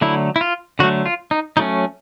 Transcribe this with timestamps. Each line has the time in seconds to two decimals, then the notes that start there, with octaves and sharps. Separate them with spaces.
0.01 D3 F#3 A3 E4
0.36 E4
0.41 F4
0.79 D3 F#3 A3 F#4
1.06 F4
1.31 D#4
1.57 F#3 A3 C#4 D#4